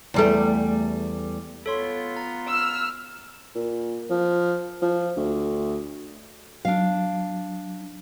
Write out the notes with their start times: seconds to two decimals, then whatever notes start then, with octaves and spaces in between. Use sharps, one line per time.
0.14 E2 G3 A3
1.66 B3 F4 A4 C#5 C6
2.17 A#5
2.49 E6 F6
3.55 A#2
4.10 F3
4.82 F3
5.16 D2
6.65 F#3 D4 F5